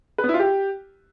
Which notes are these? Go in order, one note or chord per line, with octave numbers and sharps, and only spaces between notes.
B4
B3
E4
F4
G4